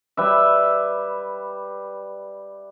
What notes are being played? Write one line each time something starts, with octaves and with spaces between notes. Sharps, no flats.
G3 B4 E5